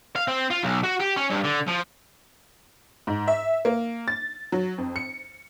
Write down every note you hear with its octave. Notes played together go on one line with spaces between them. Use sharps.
F5
C4
F4
B1
F#4
G4
C#4
G2
D3
F3
G#2
E5
A#3
A6
F#3
F2
C#7